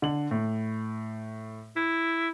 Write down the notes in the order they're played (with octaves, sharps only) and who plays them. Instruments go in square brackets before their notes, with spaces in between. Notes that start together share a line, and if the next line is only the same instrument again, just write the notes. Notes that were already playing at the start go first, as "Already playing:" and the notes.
[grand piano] D3 F#7
A2
[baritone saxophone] E4